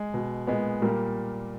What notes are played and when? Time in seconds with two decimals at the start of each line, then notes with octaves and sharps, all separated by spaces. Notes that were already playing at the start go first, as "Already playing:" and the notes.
Already playing: G#3
0.14 B2
0.47 A#2 G#3 B3
0.82 A#2 G3 A#3